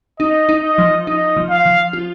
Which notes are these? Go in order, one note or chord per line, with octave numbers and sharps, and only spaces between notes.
D#4 D#5
D#4
D#5
F3
D#4 D#5
F3
F5
F3
F4